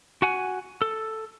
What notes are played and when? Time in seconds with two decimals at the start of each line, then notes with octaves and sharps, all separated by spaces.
0.22 F#4 F#5 G#5
0.82 A4